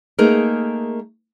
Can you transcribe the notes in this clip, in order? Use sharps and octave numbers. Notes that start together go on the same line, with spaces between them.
A3 A#3 D#4 G#4 A#4